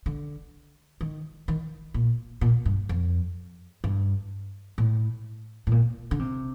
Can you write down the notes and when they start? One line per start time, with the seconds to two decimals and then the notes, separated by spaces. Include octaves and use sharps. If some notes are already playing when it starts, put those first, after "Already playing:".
0.06 D3
1.01 D#3
1.48 D#3
1.94 A#2
2.41 A#2
2.65 G2
2.89 F2
3.84 G2
4.78 A2
5.67 A2
5.72 A#2
6.11 D3
6.19 C3